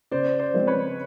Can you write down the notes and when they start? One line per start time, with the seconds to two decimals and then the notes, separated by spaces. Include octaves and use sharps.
0.11 C#3 C5 D5
0.39 C5 D5
0.54 F3 G#3 C4
0.67 B4 C#5